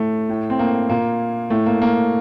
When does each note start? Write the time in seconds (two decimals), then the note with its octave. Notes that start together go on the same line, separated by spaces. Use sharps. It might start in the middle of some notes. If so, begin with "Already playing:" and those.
Already playing: A2 A3
0.29 A2
0.50 C4
0.59 A#3
0.89 A#2 A#3
1.50 A2 A3
1.66 A#3
1.82 A#3